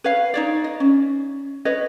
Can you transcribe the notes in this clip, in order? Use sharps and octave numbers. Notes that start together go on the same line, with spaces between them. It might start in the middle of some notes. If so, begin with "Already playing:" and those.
B4 C#5 F5
D#4 C#5 D5
D#5
C#4
B4 C#5 D#5